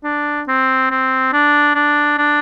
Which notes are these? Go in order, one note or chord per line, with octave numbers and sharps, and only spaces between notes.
D4
C4
C4
D4
D4
D4